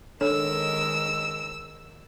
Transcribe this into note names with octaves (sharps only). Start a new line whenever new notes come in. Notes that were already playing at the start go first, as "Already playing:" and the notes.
D#3 G#3 D4 A4 A#4 C#5 E6